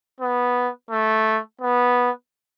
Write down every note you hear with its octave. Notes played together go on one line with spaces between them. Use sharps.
B3
A3
B3